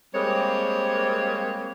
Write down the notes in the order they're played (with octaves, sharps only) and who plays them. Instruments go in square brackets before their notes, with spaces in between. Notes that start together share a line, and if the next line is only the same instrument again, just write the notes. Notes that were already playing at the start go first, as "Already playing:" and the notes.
[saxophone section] G3 G#3 A#3 C4 C#5